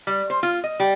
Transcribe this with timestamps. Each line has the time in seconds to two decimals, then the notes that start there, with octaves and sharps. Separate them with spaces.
0.07 G3
0.30 C5
0.43 F4
0.64 D#5
0.80 G3